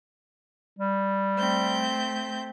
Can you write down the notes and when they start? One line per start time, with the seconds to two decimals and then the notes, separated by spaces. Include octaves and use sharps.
0.79 G3
1.36 A3 C4 G6